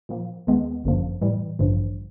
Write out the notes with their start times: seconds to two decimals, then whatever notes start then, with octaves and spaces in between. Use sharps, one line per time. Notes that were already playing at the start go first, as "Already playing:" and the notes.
0.09 A#2 F3 A#3
0.47 D#2 D#3 G#3 B3
0.84 G1 F#2 D3 F3 A#3
1.21 A2 E3 G3
1.59 A1 G2 D3 F3